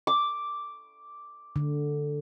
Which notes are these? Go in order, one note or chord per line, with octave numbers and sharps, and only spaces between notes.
D6
D3